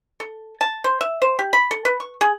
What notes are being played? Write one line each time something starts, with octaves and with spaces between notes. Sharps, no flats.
A4
A5
C5
E5
C5
G4
B5
A4
B4
C#6
G#4